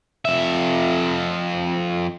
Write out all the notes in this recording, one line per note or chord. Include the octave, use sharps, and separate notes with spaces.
F2 E5